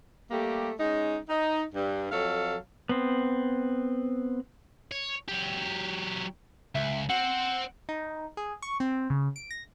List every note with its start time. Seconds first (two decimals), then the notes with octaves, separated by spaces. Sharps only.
0.31 G3 A3 A#3 G4
0.80 G#3 C#4 D#4
1.29 D#4
1.74 G2
2.12 F2 F#3 A4 F5
2.89 B3 C4
4.91 C#5
5.29 F#3 G4
6.75 C#2 E5
7.09 C4 F#5
7.89 D#4
8.37 G#4
8.62 C#6
8.80 C4
9.10 C#3
9.36 D7
9.51 A#6